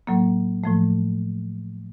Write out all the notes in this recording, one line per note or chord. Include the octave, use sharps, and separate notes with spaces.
A2 F#3 A#3
A2 F3 A3